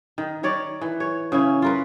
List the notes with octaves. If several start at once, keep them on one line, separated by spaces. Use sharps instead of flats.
D#3
D#3 C#5 D5
E3
C#5
C#3 C#4 E4
F4 A#4 B4